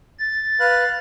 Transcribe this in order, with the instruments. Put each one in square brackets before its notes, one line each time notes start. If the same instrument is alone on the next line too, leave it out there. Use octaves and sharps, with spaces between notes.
[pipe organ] A6
[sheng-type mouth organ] B4 F5 F#6